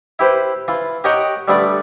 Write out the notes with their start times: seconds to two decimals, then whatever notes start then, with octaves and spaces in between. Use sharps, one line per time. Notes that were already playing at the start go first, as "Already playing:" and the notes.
0.19 E4 G4 B4 C5
0.68 E3 F4
1.04 G4 A#4 C#5 D#5 F#5 G5
1.48 D3 G3 A3 B3 D4 D5